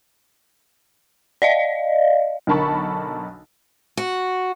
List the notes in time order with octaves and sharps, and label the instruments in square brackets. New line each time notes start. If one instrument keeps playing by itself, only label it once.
[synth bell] D5 D#5 F5
[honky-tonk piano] B1 D3 A#4 A5 B5 C#6
[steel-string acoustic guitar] F#4